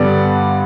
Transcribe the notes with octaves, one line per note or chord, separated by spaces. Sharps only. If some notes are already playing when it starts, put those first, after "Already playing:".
Already playing: G2 D3 G3 B3 D5